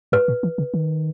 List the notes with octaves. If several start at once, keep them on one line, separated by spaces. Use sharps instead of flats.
G#2 B4
A#2
E3
C#3
D#3